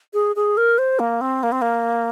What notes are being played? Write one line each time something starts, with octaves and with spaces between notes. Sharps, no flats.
G#4
G#4
A#4
C5
A#3
C4
A#3
C4
A#3